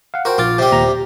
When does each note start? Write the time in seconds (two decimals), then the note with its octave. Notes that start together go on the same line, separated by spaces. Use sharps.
0.14 F5 F#5
0.25 F#4 A#4 C5 G5
0.38 A#1 F4 D6 A6
0.58 C3 G3
0.71 D#2 A#2 A#5
0.88 G4